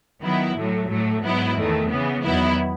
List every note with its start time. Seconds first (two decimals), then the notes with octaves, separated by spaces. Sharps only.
0.22 D#3 F#3 B3 E4
0.56 A2 F#3 A3
0.89 A2 F#3 A3
1.23 G#2 F#3 B3 E4
1.56 E2 D#3 A3
1.90 C#3 E3 B3
2.23 E2 D#3 F#3 B3 E4